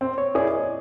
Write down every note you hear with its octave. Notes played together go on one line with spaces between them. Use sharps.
C4
C#5
E4 G#4 D5
D#5